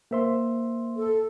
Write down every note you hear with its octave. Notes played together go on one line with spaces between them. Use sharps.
A#3 A#4 C5 E5 C6
A4